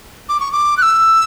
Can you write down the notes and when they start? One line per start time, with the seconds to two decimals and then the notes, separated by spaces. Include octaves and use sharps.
0.29 D6
0.40 C#6
0.52 D6
0.78 F#6
0.82 E6